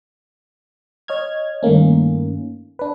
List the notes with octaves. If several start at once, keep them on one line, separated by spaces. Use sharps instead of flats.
C#5 D#5 F6 G#6
G2 D#3 A3 A#3 C#4
D4 B4